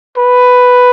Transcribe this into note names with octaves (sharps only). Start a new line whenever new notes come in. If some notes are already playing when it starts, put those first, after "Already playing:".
B4